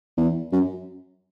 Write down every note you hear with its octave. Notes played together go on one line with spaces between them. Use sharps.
E2
F#2